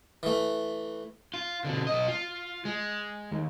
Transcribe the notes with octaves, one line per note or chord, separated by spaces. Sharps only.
E3 A3
F4
B2 D3
B1 D#5
F4
G#3
D#2